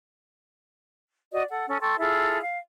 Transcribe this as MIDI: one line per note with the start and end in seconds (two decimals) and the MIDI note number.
1.33 1.43 66
1.33 1.43 74
1.33 1.43 75
1.50 1.65 69
1.50 1.65 78
1.67 1.77 61
1.67 1.77 69
1.81 1.97 69
1.81 1.97 79
1.81 1.97 84
1.81 1.97 85
1.99 2.40 64
1.99 2.40 65
1.99 2.40 68
1.99 2.40 69
2.41 2.57 77